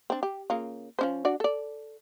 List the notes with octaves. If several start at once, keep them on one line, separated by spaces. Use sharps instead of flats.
C4 D4
G4
C#3 A#3 F4
F3 C#4 C5
D4 F#4 D5
A4 D5